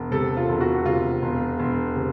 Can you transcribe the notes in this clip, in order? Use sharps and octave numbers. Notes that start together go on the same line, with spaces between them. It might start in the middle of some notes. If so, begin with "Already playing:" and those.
Already playing: E1
C3 A4
F4
E1
F#4
C3 F4
E1
E1
C3